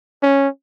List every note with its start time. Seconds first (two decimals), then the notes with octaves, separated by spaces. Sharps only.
0.23 C#4